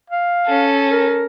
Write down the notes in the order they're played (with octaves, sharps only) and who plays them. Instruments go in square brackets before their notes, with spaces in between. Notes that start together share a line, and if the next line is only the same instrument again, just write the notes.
[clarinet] F5
[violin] C#4 A4
[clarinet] A#4